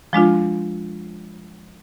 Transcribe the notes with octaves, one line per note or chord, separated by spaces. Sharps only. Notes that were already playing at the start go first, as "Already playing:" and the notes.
F3 G#3 D4 F4